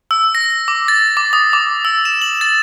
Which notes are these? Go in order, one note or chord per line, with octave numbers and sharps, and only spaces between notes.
E6
A#6
D6
A6
D6
D#6
D6
E6
E7
F#7
A6